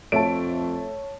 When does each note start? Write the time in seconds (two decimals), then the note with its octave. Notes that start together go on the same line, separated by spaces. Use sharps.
0.12 F2 A3 C#5 A5 D7